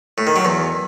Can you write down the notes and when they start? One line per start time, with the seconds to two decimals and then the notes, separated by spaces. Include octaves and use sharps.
0.18 A2
0.27 D#3
0.36 F#3
0.45 E2